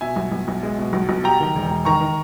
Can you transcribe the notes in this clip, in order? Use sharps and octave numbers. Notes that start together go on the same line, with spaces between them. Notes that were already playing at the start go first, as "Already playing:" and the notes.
B2 E5 G#5
B1
B1
B1
G#3
B2
B1
B1
G3 G5 A#5
D#3
E1
E1
D#3 A#5 C#6
D#3